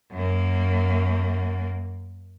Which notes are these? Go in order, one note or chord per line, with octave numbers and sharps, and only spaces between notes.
F#2 A#3